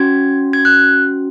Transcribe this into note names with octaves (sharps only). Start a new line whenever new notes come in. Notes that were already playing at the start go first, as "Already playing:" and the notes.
Already playing: C#4 F#4 G#6
G#6
F#6